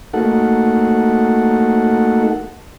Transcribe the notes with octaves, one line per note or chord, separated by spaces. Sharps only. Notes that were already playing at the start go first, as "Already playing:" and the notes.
A3 A#3 D#4 F#4 A4 F#5